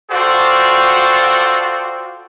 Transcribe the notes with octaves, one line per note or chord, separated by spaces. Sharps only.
F4 F#4 A4 C5 D5 G5